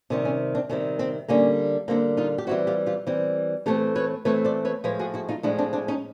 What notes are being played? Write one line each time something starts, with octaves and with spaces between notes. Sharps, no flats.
C3 D#3 G3 C4 C#4
C#4
C4 D4
C3 D#3 G3 C4 C#4
C4
D3 G3 A#3 C#4
D3 G3 A#3 C4
D#4 F4
G4
E3 G3 C4 E4 F#4
F4 G4
F4 G4
E3 G3 C4
E3 A3 C4 G4 A4
B4 C#5
E3 A3 C4 B4 C#5
C5 D5
B4 C#5
A2 F3 G#3 B4 C#5
F#4 G#4
E4 F#4
D#4 F4
A2 F3 G#3 D4 E4
C4 D4
C4 D4
C#4 D#4